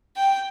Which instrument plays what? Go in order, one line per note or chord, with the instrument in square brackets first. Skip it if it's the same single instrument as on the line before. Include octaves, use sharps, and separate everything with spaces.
[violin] G5